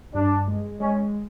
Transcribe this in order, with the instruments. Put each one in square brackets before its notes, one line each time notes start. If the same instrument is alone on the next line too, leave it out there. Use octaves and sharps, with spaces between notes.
[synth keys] G2 [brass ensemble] D4
[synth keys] G#3
[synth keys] G#3 [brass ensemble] C#4